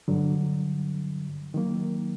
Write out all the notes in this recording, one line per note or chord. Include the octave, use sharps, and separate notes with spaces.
G2 D3 F#3
D#3 F#3 A#3